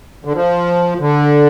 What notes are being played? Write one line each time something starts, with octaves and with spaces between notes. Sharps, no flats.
D3
F3
D3